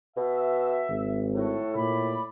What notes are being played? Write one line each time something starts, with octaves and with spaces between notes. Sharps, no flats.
B2 E5
G#1
A2 F#4 A4
A#2 D5 B5